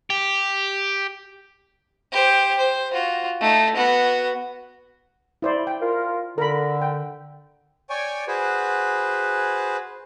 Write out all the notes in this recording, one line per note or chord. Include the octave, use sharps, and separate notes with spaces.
G4
G4 C5
C5
F4 F#4
A3 D#4
B3 F#4
E4 C5 D5
G5
F4 A#4
D3 A#4 B5
G5
C#5 D5 G5 G#5 C#6
F#4 G#4 B4 C5